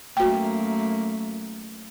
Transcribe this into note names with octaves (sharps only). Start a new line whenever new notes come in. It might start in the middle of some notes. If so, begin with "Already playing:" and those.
F#2 A3 A#3 F#4 G5